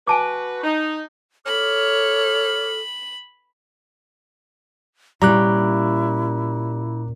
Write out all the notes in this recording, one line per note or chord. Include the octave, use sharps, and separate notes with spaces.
F#4 B4 G#5 A5 D6
D#4
A4 C#5 B5 D6 F6
A#2 G3 C#4 E4 A#5 D6 F#6